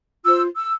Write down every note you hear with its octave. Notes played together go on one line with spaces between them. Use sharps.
F4 C5 E6
E6